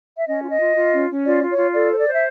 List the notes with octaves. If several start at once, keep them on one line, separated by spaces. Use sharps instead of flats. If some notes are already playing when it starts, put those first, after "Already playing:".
E5
C#4 D#5
F4
D#5
F4
F4
C#4
C#4
F4 D5
F4
C#5
F4
A4 D5
C5
D5
C5
E5